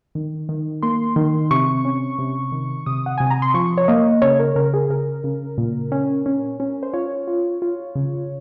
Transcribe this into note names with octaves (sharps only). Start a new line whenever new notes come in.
D#3
D#3
A#3 C6
D#3
C3 C#6
C#4
C3
D#3
C3 D#6
F#5
C3 G#5
A#5
C6
F3 C#6
C#5
A#3 D#5
C#3 C#5
A#4
C#3 A#4
G#4
C#3 A#4
C#3
A#2
C#4
C#4
C#4
C5
F4 C#5
F4
F4
C#3